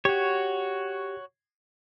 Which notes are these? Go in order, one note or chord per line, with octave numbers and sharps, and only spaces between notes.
F#4 G4 C#5